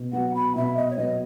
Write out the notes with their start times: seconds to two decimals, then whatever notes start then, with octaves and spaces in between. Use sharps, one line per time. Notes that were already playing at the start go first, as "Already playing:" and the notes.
Already playing: B2
0.13 F#3 B3 F#5
0.34 B5
0.56 B2 E5
0.76 D#5
0.91 C#5
0.97 F#3 B3 D#5